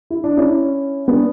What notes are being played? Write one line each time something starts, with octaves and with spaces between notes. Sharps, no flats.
E4
D4
C#4 E4
B3 D4